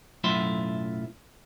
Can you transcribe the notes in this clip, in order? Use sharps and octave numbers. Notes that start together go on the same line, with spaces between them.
B1 F#2 A2 F4 E5 C6